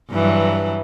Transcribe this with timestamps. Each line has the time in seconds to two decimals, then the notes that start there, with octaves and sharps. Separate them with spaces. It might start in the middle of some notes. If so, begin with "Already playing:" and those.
0.12 G2 E3 F#3